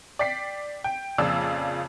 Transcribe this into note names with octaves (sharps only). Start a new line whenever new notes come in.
D5 G5 B6 C7
G5
F2 A#2 C#3 D5 E6